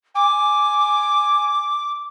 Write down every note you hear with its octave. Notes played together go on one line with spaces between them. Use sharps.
G#5 D6